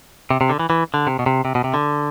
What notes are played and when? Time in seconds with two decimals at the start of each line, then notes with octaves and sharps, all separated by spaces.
0.30 C3
0.41 C3
0.50 D3
0.59 E3
0.70 E3
0.94 D3
1.07 C3
1.19 B2
1.26 C3
1.45 C3
1.55 B2
1.64 C3
1.74 D3